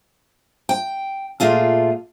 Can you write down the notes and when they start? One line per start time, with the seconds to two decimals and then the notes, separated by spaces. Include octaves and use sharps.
0.69 G5
1.40 A#2 A3 F4 G#4